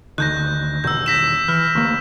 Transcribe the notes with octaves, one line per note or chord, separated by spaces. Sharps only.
D2 D3 D#3 F#6 G6 A#6
E2 B2 D#3 E6 G6
A#6 B6 E7
E3 F6
D2 A#3